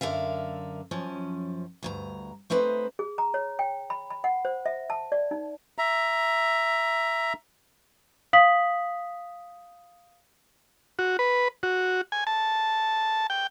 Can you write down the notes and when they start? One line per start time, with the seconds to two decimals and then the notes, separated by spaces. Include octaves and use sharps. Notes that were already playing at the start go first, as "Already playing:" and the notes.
0.01 F#2 D3 A#4 E5 F5
0.91 F#2 F3 C#4
1.83 D2 G2 A#5
2.50 A3 C4 D#4 B4 C5
2.99 G#4
3.18 A#5
3.34 C#5
3.59 G5
3.90 B5
4.10 B5
4.24 F#5
4.45 C5
4.66 E5
4.90 A5
5.12 D5
5.31 D#4
5.78 E5 A#5
8.33 F5 D#6 B6 F#7
10.99 F#4
11.19 B4
11.63 F#4
12.12 G#5
12.27 A5
13.30 G5